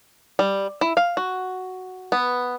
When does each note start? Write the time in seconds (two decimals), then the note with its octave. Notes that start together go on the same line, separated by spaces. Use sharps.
0.39 G3
0.81 E4
0.97 F5
1.17 F#4
2.12 B3